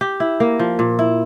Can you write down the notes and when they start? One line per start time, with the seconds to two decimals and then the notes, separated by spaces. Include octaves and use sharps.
0.01 G4
0.20 E4
0.40 A#3
0.59 F3
0.79 A#2
0.99 E4